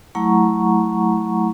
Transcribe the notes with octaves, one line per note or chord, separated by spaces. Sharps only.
F#3 A3 E4 F#5 A#5 C#6